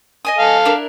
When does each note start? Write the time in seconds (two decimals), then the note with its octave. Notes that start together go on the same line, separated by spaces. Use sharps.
0.25 D#5 G#5 D#6
0.39 A4 F5
0.65 D4 E4 A#4